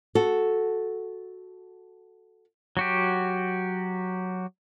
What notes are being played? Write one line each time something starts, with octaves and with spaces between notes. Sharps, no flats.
F#4 A4
F#3 F#4 G4